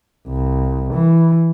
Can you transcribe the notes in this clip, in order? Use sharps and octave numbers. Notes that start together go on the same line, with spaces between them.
C2
E3